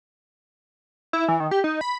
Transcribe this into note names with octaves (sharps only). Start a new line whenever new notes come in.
E4
E3
D#3
G4
D#4
B5